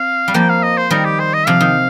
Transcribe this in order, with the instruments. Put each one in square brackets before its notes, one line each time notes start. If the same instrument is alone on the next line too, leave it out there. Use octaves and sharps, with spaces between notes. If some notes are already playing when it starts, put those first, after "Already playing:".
Already playing: [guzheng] C4 [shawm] F5
[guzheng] G3
[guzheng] F3 A#3 [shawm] G5
[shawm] F5
D#5
C5
[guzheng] D#3 G3 [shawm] A#4
[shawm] G4
C5
D#5
[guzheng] C3 F3 [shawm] F5
[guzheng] D#3